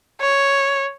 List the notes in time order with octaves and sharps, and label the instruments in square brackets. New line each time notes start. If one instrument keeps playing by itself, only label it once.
[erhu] C#5